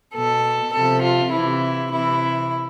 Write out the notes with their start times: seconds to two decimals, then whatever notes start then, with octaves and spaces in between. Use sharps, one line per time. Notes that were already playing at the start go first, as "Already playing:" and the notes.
0.15 B2 A4
0.73 C3 F3 A4
1.03 F4
1.32 C3 E3 E4
1.91 C3 E3 E4